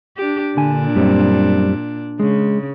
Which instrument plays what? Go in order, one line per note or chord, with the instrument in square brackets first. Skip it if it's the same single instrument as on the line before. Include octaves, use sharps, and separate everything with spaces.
[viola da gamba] D4 G4
[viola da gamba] A#2 D4 [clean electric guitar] D3 G#5
[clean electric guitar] F#2 G3 C4
[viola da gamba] C#3 [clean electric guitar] G#3